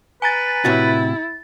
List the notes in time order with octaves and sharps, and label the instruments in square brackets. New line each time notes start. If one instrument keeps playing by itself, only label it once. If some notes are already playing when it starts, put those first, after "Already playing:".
[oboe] B4 [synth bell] G#5 A#5 A6
[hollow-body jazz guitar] A2 C3 F#4 [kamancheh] E4 [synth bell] A6